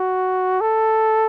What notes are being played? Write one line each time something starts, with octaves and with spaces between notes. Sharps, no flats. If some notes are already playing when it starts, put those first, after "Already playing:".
Already playing: F#4
A4